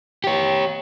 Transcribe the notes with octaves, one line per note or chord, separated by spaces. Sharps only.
G4 C#5